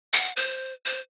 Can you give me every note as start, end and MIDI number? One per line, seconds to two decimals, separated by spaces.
0.13 0.32 78
0.37 0.73 72
0.85 0.99 72